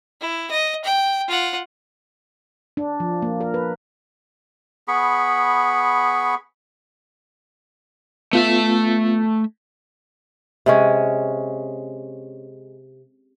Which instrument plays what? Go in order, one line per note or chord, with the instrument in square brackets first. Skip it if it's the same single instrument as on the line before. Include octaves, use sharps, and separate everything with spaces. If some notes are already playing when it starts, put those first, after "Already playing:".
[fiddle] E4
D#5
G5
F4 F#5
[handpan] D4
F3
A#3
A#4
B4
[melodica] B3 G#4 B5 C#6
[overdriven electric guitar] A3 E5 [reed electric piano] B3 F4
[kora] C3 G#3 C#4